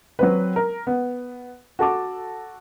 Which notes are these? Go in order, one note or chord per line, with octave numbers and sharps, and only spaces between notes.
F#3 C4 B4
A#4
B3
F#4 A4 A5 D6